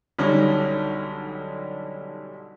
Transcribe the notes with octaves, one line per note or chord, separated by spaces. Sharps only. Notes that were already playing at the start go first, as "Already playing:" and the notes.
B1 D3 G3 C#4 D#4